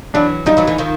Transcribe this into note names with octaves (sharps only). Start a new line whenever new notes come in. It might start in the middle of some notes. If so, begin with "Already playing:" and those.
E3 F#3 D4
F3 G3 D#4
E3 F#3
D3 E3
D#3 F3